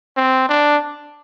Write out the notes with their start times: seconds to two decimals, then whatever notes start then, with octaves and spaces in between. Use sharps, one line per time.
0.17 C4
0.49 D4